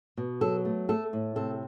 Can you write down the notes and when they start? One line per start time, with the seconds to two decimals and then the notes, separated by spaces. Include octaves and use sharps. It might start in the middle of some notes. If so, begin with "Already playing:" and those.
0.17 B2
0.41 F#3 A4
0.65 A3
0.89 A3 A4
1.13 A2
1.36 C3 A4